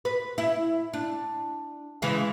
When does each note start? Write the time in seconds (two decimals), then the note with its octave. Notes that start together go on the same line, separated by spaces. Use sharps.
0.05 B4
0.38 E4
0.94 D4
2.02 C#3 E3 G#3